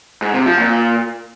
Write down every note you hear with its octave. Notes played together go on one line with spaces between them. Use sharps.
G#2
C3
F3
A#2